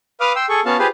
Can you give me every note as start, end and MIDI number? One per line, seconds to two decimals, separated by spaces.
0.20 0.33 71
0.20 0.33 77
0.20 0.33 86
0.20 0.33 87
0.20 0.33 89
0.36 0.46 79
0.36 0.46 84
0.36 0.46 88
0.49 0.61 68
0.49 0.61 69
0.49 0.61 85
0.65 0.77 59
0.65 0.77 61
0.65 0.77 66
0.65 0.77 77
0.65 0.77 81
0.79 0.87 65
0.79 0.87 67
0.79 0.87 68
0.79 0.87 71
0.79 0.87 72
0.79 0.87 77